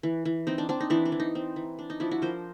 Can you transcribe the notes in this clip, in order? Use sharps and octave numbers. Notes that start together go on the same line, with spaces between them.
E3
E3
C4 D#4
D4
C4 D4
D#4
E3 D4 E4
D4
E3
D#4
C4
E3
D4
D#4
F3 D4 E4
E4 F#4
F3 A#4 C5